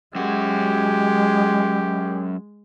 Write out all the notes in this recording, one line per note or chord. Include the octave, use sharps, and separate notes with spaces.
F#2 G#3 F#4 G4